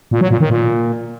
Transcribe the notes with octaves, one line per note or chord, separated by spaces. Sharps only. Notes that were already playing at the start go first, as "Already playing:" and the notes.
A#2
F#3
A#2
D#3
A#2